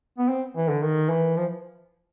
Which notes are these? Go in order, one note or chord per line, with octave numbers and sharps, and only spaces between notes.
B3
C4
E3
D3
D#3
E3
F3